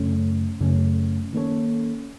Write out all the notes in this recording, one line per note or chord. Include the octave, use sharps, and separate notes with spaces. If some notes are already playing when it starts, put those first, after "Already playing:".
Already playing: F#2 C#3 A3 C#4
F#2 C#3 A3 C#4
D#3 A#3 C#4 A4 C#5